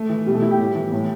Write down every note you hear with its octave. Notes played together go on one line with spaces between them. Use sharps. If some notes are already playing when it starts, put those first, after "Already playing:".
Already playing: A3
E3
B2 G3
A3
E4
G4
A2
E3
A2